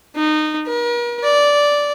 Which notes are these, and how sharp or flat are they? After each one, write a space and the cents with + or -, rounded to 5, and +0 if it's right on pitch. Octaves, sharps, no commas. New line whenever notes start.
D#4 -20
A#4 +45
D5 -10